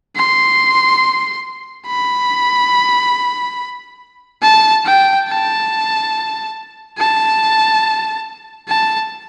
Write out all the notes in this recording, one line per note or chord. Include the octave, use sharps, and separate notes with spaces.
C6
B5
A5
G5
A5
A5
A5